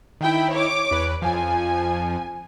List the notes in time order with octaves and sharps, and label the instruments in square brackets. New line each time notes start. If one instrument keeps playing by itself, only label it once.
[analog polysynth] D#3 E4 [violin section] G5 B5
[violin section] C#5 D6
[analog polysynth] E2 B4
[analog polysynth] F2 F3 [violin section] G#5